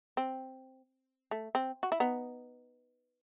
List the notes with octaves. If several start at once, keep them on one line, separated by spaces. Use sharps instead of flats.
C4
A3
C4
F#4
E4
B3 D#4